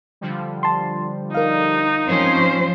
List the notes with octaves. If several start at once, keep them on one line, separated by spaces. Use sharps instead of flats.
D3 F3 G3
A5 C6
D#4 A#4 F5
F3 C4 C#4 C5 C#5